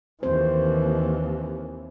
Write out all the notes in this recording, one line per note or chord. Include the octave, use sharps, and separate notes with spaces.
D#2 E3 C4 C5